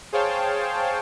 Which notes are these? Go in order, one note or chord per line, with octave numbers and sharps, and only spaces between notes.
G#4 C5 C#5 F5 G5 A5